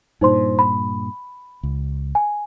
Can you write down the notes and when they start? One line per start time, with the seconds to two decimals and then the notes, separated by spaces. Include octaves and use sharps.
0.21 G2 A#2 D#4 C5 C6
0.59 B5
1.63 C#2
2.15 G#5